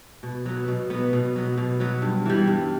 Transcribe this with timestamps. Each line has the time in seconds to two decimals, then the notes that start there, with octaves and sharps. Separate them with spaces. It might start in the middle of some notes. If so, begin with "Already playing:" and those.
0.23 B2
0.46 F#3 B3
0.68 B2
0.90 F#3 B3
1.13 B2
1.36 F#3 B3
1.58 B2
1.80 F#3 B3
2.02 G2
2.26 E3 G3
2.47 G2